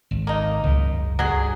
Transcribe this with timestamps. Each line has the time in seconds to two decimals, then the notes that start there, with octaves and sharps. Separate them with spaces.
0.11 G#1
0.27 A#3 D#4
0.64 F#1 C#2 G#2
1.19 G2 F#3 G#4